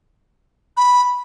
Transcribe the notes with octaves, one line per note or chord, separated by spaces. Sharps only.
B5